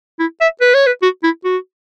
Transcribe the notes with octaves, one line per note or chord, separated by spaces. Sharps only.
E4
E5
B4
C#5
B4
F#4
E4
F#4